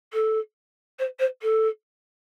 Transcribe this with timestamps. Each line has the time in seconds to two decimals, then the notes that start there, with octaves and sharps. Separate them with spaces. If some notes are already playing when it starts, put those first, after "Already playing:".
0.13 A4
0.99 C5
1.19 C5
1.42 A4